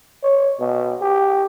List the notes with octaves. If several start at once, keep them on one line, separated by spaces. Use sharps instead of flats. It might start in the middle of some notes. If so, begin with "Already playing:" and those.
C#5
B2
G4